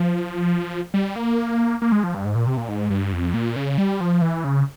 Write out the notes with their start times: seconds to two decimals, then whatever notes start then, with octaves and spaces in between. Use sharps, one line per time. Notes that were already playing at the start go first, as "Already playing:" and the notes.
Already playing: F3
0.94 G3
1.16 A#3
1.82 A#3
1.92 G#3
2.04 F3
2.15 G2
2.25 G#2
2.35 A#2
2.47 C3
2.57 A#2
2.69 G#2
2.90 G2
3.13 F2
3.34 A#2
3.56 C#3
3.78 G3
4.01 F3
4.22 E3
4.44 C#3